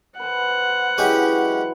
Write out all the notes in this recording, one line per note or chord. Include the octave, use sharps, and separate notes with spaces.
B4 C5 F#5 A5
E3 F#3 G#3 C#4 G4